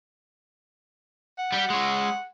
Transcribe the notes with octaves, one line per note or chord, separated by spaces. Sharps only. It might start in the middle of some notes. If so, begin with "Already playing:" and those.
F#5
G3 G4
G#3 C#5